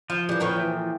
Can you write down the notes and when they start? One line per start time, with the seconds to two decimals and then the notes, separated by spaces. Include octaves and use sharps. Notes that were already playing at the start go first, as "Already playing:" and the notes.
0.10 F3 F4
0.29 E3 G3 A#3
0.40 A#2 A4 B4 C#5 G5 A#5
0.56 E3